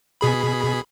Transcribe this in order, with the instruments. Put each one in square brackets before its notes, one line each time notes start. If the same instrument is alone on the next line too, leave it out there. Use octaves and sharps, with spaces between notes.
[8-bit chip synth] B2 G#4 B5